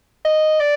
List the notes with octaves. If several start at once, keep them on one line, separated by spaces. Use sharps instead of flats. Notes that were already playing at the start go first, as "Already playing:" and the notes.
D#5
D5